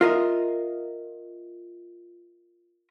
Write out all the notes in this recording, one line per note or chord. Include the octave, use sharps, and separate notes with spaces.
F4 A#4 D#5 E5